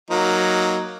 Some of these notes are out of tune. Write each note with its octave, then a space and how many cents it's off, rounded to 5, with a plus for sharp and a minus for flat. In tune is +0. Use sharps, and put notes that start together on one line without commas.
F#3 +0 A#3 +0 D#4 +0